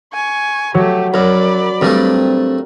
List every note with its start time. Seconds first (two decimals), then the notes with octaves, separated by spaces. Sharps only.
0.13 G#5 C#6
0.74 F#3 A3 G4
1.14 F#2 A#4 D5 B5
1.81 G2 G3 A3 C4 A#4